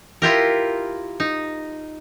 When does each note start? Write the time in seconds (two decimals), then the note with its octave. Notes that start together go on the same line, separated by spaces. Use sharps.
0.22 E4 F4 G4 A#4
1.20 D#4